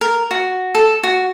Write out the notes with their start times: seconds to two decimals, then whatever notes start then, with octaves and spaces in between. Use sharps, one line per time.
0.01 A#4
0.31 F#4
0.75 A4
1.03 F#4